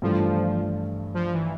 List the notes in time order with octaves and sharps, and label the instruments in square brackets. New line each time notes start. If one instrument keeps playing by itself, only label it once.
[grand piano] G2 E3 A3 D4 A4 [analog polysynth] F3
[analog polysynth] F3
E3